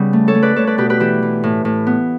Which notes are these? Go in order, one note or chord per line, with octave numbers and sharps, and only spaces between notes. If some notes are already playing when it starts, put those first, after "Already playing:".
Already playing: C#3 G3 B3
A3
A4 C#5
A3
B4 D5
A3 A4 C#5
B4 D5
B2 G4 B4
G4 B4
E3 E4 G4
E3
A2
A2
B3